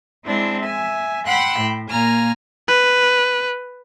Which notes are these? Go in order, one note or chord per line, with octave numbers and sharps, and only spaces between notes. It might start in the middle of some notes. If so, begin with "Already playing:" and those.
G#3 C4 D4 E4
E5 G#5
F#5 G5 B5 C6 E6 F#6
A2
A#2 A#3 G#5 A#5 F6
B4